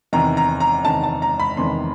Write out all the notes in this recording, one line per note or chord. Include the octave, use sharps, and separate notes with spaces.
E2 C3 D#3 A#5
A#5
A#5
E2 C3 D#3 A5
A5
A#5
B5
E2 C3 D#3 C6